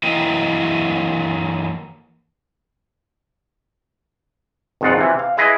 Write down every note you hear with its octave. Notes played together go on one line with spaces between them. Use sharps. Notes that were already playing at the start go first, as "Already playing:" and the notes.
E3 F#3 A#3 E4 D#5 G5
G#1 F2 G#2 B2 F4 F#5
C3 E3
F5
E4 G#4 B4 D#5